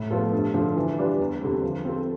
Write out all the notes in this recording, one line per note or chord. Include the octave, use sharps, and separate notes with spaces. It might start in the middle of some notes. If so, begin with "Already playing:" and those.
Already playing: A2
F3 B3 F4 A4
G2
D3 F3
E3
G3 D4 F4 B4
E2
D3 G3 C4
F3
C4 F4 A4